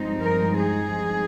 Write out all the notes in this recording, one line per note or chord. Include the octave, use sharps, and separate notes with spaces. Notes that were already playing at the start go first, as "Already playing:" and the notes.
Already playing: G2 F3 G#3 C4 D#4
A#4
G#4